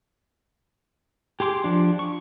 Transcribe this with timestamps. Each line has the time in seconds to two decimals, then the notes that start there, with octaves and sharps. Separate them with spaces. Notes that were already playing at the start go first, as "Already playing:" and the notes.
1.40 G4 G#4 C6 D6
1.64 F3 D4
1.99 C#6